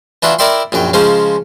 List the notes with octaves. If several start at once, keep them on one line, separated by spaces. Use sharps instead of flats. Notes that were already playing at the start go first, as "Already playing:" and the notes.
E3 D4 F4 F#4 E5
E4 A#4 D5 E5 G5 C6
A#1 F#2 F#3 G5
C#3 F3 G#3 C#4 C5